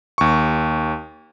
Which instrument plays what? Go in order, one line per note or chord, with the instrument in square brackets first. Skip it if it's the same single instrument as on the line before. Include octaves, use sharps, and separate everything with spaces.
[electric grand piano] D#2 C#6